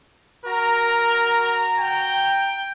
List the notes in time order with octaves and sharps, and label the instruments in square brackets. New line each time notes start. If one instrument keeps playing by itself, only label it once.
[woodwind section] F#4 A#5 [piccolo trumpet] A#4
[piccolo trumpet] G5